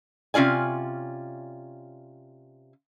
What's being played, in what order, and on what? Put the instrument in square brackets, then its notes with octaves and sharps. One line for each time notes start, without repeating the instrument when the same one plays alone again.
[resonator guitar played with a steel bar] C3 C#4 F4 D5 G#5